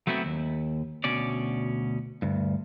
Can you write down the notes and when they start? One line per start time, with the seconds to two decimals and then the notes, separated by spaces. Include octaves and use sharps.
0.07 F#3 A3 B3 C4 E4
0.25 D#2
1.04 D2 B2 C#4 D5
2.22 D2 G2